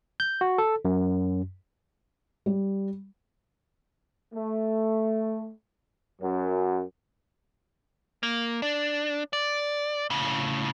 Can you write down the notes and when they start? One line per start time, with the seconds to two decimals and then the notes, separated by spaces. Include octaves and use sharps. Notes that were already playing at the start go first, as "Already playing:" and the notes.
0.20 G6
0.41 F#4
0.58 A4
0.85 F#2
2.46 G3
4.33 A3
6.20 F#2
8.23 A#3
8.62 D4
9.33 D5
10.10 A2 C#3